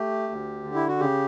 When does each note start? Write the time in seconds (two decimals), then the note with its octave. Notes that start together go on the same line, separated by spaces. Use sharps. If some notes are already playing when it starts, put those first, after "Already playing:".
Already playing: A3 G4
0.29 D2
0.64 D3
0.75 E4
0.88 F#4
1.00 C#3 G4